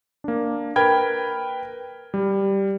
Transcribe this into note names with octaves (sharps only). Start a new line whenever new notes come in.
A#3 D4
A#4 B4 G5 B5 F6 G#6
G3